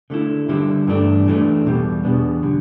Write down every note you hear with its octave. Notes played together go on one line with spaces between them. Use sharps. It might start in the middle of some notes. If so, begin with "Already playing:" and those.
D3 A3 E4
D3 G3 E4
G2 E3 A3 D4
A2 E3 A3 D4
E2 B2 G3
E2 B2 B3 D4
D3 G3